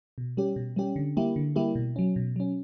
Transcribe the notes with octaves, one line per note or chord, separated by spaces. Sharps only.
B2
G3 C#4 G4
B2
G3 C#4 G4
D3
G3 A#3 E4 G4
D3
G3 A#3 E4 G4
B2
F#3 C#4
B2
F#3 C#4